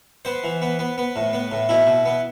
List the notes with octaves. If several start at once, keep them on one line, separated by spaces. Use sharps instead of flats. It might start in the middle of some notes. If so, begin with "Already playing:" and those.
B3 C5
E3
B3
B3
B3
A2
B3
A2
B2 E4
B2
B3